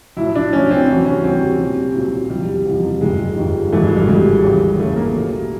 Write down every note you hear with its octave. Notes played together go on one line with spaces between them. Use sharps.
B1 A2 F3 E4
D4
B1 A2 F3 C#4
C4
D2 C3 E3 G3
C#4
D2 C3 E3 G3 C4
B1 A#2 G3
B1 A#2 G3
F#1 E2 C3 F3 G3
F#1 E2 C3 F3
G1 G2 D#3 G3 G#3
G1 G2 D#3 G3
G#1 G2 E3 A3
G#3
G3
G#1 G2 E3 G#3
D#2 C#3 E3
D#2 C#3 E3 A3
A#3
B1 A#2 G3